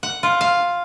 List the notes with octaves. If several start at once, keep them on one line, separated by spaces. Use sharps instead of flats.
F#5
F4
F5